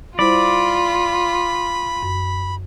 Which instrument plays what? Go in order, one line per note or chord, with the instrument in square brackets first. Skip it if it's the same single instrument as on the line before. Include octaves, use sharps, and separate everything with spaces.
[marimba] G3 E4 C5 [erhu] F4 [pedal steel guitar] D5 [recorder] B5
[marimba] F#2